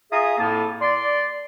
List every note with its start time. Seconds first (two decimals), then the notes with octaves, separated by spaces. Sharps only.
0.11 F4 G#4 E5 G#5 A#5 D#6
0.38 F2 A2 A#3 A4 A5
0.81 D5 C6